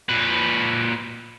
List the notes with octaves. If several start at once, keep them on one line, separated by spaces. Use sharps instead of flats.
A#2 B4